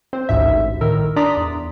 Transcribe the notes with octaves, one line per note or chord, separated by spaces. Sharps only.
C4 C5
A1 D2 G#2 E5
A2 D#3 A#4 E6
D4 D5 A#5 C6 D#6 B6
E2